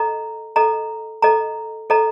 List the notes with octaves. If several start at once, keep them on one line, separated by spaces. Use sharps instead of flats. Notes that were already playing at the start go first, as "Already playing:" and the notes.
Already playing: A4 D#5 A#5
A4 D#5 A#5
A4 D#5 A#5
A4 D#5 A#5